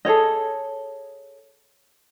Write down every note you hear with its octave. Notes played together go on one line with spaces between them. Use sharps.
G#4 A4 C#5 D#5